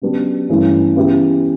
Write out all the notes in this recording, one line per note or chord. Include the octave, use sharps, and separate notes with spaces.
C#3 F#3 B3 D4 G4
G2 E3 A3 C#4 E4
C#3 E3 B3 E4 G4